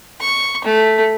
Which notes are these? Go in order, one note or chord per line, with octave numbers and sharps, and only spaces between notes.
C#6
A3